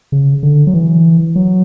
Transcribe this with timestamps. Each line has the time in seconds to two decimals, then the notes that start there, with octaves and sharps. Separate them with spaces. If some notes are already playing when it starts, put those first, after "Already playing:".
0.12 C#3
0.43 D3
0.67 F#3
0.74 E3
1.35 F#3